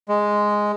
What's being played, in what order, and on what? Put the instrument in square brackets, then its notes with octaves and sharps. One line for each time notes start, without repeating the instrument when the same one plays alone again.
[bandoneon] G#3